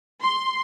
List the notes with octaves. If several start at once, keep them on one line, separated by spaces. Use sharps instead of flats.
C6